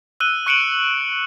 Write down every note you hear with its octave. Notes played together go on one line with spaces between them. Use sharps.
E6 F#6 D#7 G7
C#6 F#6 C#7 D7 E7 F#7